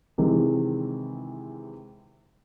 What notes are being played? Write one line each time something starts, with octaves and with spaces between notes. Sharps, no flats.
C3 D#3 E3 G#3